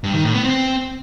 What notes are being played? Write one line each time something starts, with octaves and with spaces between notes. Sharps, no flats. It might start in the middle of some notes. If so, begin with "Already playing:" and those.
G2
D#3
A2
B3
C4